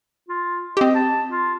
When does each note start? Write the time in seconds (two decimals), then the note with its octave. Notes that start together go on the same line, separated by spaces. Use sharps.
0.28 F4
0.77 C4 G4 D#5
0.95 A5
1.29 F4